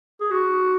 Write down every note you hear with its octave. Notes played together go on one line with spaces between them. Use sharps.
G#4
F#4